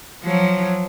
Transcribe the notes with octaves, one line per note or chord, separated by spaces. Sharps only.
F3 F#3